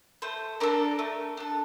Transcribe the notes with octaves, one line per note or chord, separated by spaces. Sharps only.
A3 C5
D4 A4 A#4
A3
D4 A4